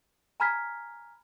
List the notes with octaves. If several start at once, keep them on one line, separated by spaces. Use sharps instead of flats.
G#5 A#5 B5 F6 G#6 B6